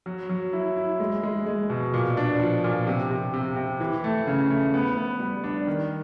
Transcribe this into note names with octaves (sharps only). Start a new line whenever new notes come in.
F#3
F#3
E4
E4
G#3
G#3
G#3
B2
A#2
D4
F3
A#2
C3
C3
C3
C3
E3
A3
C#3
A3
B3
B3
G3
D4
D#3